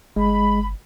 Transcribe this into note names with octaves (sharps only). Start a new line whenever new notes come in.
G1 G#3 B5